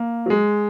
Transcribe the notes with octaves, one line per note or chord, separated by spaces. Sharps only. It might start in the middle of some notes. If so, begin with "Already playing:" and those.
Already playing: A#3
F#3
G#3